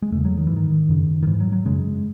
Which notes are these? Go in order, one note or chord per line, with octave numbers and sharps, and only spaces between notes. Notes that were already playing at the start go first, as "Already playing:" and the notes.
G#3
E2 C#3 A3
F#3
D#3
G#2 E3
D#3
F#2 C#3
D#3
G#2 E3
F#3
F#3
F#2 C#3 G#3